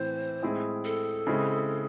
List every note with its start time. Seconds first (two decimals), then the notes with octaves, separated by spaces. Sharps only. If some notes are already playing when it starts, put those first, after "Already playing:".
Already playing: A2 E3 C4 C5
0.43 A2 G#3 C4 E4 G#4
0.85 A4
1.27 C#3 G#3 C4 E4 G#4